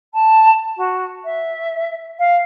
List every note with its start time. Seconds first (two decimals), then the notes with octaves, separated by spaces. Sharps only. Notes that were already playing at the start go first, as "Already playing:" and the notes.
0.14 A5
0.76 F#4
1.24 E5
2.19 F5